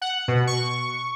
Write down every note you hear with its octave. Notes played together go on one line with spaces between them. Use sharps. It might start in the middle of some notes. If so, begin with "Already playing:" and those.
F#5
B2
C#6